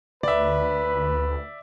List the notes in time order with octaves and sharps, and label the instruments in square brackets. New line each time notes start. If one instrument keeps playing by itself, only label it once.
[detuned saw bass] D2 [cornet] B4 [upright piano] D5 E5